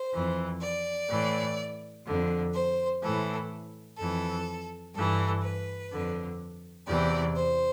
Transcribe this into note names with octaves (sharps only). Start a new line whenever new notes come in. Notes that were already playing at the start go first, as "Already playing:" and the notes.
Already playing: C5
F2 E3
D5
A2 E3
F2 D3
C5
A2 E3 A4
F2 E3 A4
G2 E3 A4
B4
F2 D3
E2 C3 E3 D5
C5